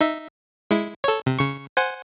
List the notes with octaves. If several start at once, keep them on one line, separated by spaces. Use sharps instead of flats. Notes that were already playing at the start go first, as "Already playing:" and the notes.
D#4 E5
G#3 E4
A4 C#5
C3
C#3 C#6
C5 F#5 G#5